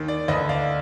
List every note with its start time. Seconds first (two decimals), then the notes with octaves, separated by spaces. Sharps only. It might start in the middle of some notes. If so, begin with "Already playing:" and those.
Already playing: D#2 D#3
0.08 D5
0.28 D2 D3 B4 D#5
0.49 D5 F5